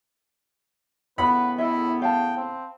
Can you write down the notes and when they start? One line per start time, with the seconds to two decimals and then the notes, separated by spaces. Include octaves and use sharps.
1.18 A2 C#3 B3 B4 F#5 B5
1.58 E4 A4 D#5 E5
2.02 F5 G5 A5
2.37 C4